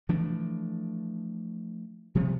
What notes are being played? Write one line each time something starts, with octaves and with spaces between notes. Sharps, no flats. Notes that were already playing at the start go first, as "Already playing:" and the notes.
E3 F3 A3 D4
C3 F3 G3 B3